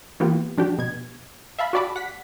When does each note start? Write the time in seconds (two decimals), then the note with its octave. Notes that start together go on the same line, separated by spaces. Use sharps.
0.20 E3 A#3 B3 F4 G4
0.57 F3 D4 F#4 G4
0.78 B2 G#6
1.59 E5 F5 A5 B5
1.73 F#4 G4 D5 A5 B5 D6
1.96 F#5 B6